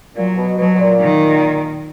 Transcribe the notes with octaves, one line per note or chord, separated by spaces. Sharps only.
A#2 F#3
B2
B2 F#3
B2
A#2
D#3